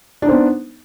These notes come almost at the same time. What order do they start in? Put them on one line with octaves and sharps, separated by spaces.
D4 D#4 C5 B3